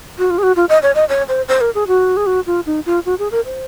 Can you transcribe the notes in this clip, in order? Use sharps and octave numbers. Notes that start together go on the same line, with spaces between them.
F#4
F4
G#4
F#4
F4
D#5
C#5
D#5
C#5
C5
C5
A#4
G#4
F#4
G#4
F#4
F4
D#4
F4
F#4
G#4
A#4
C5